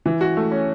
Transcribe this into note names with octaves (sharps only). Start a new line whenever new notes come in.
E3
F#4
A3
C#4